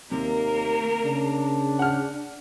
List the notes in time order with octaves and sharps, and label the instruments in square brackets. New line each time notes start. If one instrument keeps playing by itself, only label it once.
[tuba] D#2 [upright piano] C3 [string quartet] A#3 A#4
[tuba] C#3 [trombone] D4
[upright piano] F#5 F6